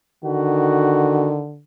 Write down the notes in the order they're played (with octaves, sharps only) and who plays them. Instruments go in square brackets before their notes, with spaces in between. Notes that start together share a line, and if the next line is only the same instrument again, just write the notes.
[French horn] D3 [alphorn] D#3 [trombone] F#4